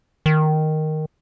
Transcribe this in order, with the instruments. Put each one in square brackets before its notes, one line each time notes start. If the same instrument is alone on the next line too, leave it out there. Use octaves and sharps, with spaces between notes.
[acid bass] D#3